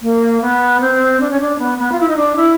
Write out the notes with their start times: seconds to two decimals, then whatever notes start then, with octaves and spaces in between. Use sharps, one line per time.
0.02 A#3
0.41 B3
0.81 C4
1.20 D4
1.31 C#4
1.40 D4
1.59 B3
1.78 B3
1.92 F4
2.00 E4
2.09 D#4
2.17 D4
2.36 E4